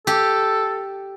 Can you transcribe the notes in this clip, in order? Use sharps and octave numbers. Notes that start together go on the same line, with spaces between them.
G4 A4